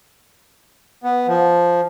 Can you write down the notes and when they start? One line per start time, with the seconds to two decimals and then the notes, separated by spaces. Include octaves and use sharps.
1.04 B3
1.28 F3